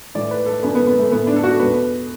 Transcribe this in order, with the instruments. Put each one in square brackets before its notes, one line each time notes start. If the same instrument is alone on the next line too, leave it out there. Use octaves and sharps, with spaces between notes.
[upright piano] A2 E3 D5
B4
A4
F#2 D3 B3
B3
B3
A3
A2 E3 B3
D4
A4
F#4
E2 B2 B4